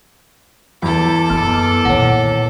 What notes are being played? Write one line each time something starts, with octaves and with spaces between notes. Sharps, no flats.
E2 A4 B5 D6
F#2 B3
A#2 D#3 C#5 F#5